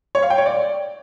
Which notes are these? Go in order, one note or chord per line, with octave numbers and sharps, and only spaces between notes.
C#5
F5
G5
C#5
D5